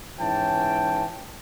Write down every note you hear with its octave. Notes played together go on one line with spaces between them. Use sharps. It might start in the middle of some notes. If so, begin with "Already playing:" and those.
G#2 E3 C#4 G5 A5